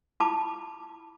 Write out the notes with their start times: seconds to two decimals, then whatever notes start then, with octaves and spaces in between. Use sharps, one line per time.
0.20 E4 F4 A5 B5 D6